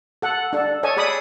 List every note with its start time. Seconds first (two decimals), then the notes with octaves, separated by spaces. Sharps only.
0.22 A4 F#5
0.53 D4 A4
0.83 A4 C#5 D#5 G#5 A5
0.97 G#4 D5 G#5 B5 D#6